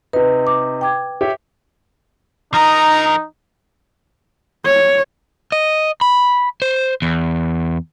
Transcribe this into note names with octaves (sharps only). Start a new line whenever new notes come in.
C3 D#4 B4
D6
G5 D6 G#6
G4 C#5 E5
F3 D#4 A#4 A#5 D#6
C#5
D#5
B5
C5
E2